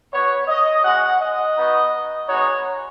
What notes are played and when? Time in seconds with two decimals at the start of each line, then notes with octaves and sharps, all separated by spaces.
0.12 B3 F#4 C#5
0.47 D#5
0.83 G#3 C#4 F#4 F#5
1.20 D#5
1.56 B3 D#4 F#4
2.28 G#3 B3 D#4 F#4 C#5